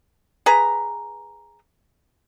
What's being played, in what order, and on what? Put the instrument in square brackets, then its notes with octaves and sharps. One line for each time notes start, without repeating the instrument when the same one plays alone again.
[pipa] G#4 B4 A#5